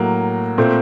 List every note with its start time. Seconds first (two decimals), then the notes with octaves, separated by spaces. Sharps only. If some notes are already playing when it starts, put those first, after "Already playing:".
Already playing: A2 F#3 A#3
0.58 A#2 A3 C4